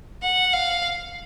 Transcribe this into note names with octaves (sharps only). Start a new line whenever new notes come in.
F#5
F5